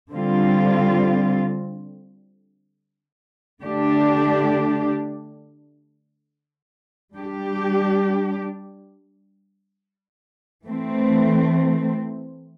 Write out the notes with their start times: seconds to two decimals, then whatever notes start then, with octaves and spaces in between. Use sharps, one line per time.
0.11 D3 G3 C4 F4
3.62 D3 A3 D4 G4
7.14 G3 D4 G4
10.66 E3 A3 C4